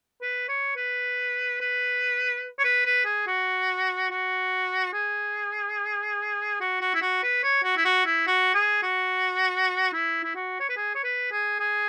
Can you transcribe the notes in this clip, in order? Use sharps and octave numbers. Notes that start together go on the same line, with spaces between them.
B4
C#5
B4
B4
C#5
B4
B4
G#4
F#4
F#4
G#4
F#4
F#4
E4
F#4
B4
C#5
F#4
E4
F#4
E4
F#4
G#4
F#4
E4
E4
F#4
C#5
B4
G#4
C#5
B4
G#4
G#4